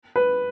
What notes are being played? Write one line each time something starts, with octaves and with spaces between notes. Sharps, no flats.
B4